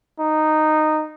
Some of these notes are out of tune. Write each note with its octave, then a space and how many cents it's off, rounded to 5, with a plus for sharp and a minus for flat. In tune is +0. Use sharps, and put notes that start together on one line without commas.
D#4 -10